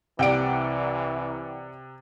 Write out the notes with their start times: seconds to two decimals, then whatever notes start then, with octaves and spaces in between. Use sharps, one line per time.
0.19 C2 C3 E3 D5 F#5 G5 D7